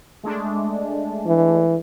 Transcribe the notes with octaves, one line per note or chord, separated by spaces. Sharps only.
G#3 A3 D4
E3